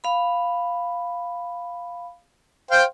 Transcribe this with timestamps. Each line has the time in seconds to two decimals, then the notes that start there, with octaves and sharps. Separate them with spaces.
0.04 F5 B5
2.71 C5 F5 G5